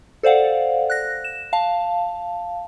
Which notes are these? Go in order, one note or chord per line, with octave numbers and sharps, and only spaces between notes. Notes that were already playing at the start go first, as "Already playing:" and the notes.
A4 C5 D5 F5 F#5
F#6 A#6
E7
F5 A5